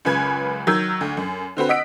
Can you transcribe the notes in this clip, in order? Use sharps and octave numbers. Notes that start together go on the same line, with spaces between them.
C#2 F#2 C#3 B4 G#5 G#6
D#3 F#3 A#4 E6 G6 G#6
D2
F#2
D3 C4 F#4 B4
D#5 F#5 E6 B6 D7